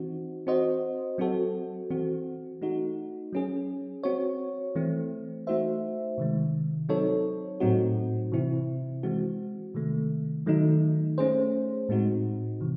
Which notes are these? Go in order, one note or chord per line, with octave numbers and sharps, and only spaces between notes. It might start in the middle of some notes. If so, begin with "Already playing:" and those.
Already playing: E3 C4 D#4 F#4
C4 F#4 C5 D#5
F#3 C4 F#4 A4
E3 C4 F#4
A3 D#4 F#4
F#3 C#4 G#4
C4 F#4 C#5
E3 A3 C4
A3 D#4 F#4 C5 E5
C3 D#3 G#3
F#3 C4 D#4 A4 C#5
A2 F#3 C4 D#4 F#4
C3 E3 C4 E4
E3 G#3 C4 F#4
C3 D#3 A3
D#3 F#3 A3 D#4
A3 C#4 G#4 C5
A2 G#3 C4 D#4 F#4
C3 E3